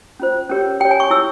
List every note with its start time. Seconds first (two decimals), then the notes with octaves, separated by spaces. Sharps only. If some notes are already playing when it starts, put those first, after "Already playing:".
0.20 C#4 F4 C5
0.49 C#4 G4 A#4 C#5
0.80 G4 G5
0.85 C#5
0.91 G#5
1.00 C#6
1.10 E4 G4 C#5 E6